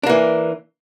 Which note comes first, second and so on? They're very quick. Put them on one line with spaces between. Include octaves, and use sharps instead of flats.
D4 A#3 E3